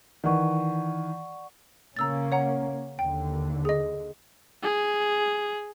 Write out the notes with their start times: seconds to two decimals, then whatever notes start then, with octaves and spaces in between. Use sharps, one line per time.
0.24 D#3 E3 D5 F#5 C#6
1.97 C#3 A#3 C#4 A#5 E6 A6
2.32 C#5 F#5 A#5
2.99 D#2 D3 G5
3.65 G#4 D#5
4.63 G#4